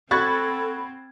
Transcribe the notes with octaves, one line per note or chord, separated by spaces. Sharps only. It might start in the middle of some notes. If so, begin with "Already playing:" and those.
C4 F#4 A4 B5 C#6 F#6 G#6 A6